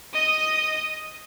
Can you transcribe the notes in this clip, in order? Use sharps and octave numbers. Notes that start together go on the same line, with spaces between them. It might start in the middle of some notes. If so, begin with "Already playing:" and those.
D#5 D#6